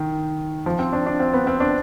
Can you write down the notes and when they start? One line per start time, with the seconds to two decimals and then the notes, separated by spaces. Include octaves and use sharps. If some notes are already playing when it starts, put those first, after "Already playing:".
Already playing: D#3
0.66 F3
0.79 C4
0.93 D4
1.06 D4
1.20 C4
1.33 B3
1.47 C4
1.60 D4